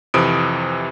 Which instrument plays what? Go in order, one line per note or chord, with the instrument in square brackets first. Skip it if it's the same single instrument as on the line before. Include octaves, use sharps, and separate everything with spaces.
[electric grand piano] F2 C3 E3 D#6 D7